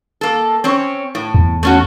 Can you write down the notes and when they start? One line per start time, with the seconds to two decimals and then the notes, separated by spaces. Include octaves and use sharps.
0.21 A#3 A4
0.64 C4 C#4 C#5
1.15 A2
1.34 E2
1.63 A3 C#4 F#4